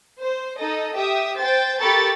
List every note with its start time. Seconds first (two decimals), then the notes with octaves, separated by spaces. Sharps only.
0.17 C5
0.56 D#4 A4 D#5
0.94 G4 E5 D#6
1.37 C5 G5 A6
1.78 G4 A4 A#4 B5 C#6 A6